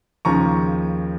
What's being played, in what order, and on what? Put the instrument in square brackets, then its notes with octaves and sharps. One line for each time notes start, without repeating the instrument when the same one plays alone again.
[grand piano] D#2 C#3 F3 A#5 C#6